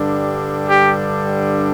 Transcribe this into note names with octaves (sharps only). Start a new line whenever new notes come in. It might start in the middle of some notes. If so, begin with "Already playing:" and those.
Already playing: G2 D3 G3 D4
G4